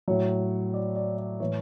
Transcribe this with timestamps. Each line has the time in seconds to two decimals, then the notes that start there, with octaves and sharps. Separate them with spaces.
0.08 A2 F#3 C#5
0.74 D5
0.96 D5
1.18 D5
1.40 A2 E3 C#5